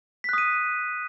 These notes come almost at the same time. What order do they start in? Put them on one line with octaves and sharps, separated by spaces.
B6 F#6 D#6 D#7